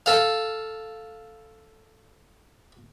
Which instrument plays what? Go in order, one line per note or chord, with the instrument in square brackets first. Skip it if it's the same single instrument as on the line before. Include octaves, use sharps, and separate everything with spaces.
[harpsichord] A4 F5